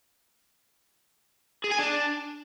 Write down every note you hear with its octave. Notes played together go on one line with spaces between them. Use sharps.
G#4
G#5
D4